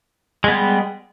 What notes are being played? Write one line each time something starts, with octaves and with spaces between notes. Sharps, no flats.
G3 G#3 B3